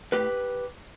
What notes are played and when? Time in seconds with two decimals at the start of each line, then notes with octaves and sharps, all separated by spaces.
0.12 A2 G4 B4